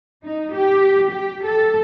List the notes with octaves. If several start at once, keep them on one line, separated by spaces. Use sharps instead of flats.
D#4
G4
G4
A4